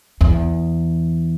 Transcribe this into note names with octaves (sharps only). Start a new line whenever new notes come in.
E2